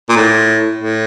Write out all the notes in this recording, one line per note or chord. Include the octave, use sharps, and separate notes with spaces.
A#2
A2
A2